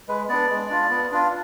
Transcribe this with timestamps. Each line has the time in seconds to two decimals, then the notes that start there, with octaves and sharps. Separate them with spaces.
0.08 G#3 B4
0.29 B3 D4 D5
0.50 G#3
0.70 D4 F4
0.90 B3
1.11 D4 F4